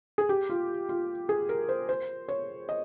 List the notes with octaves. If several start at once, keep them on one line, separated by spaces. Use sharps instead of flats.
G#4
G4
F4
F4
G#4
A#4
C5
C5
C#5
D#5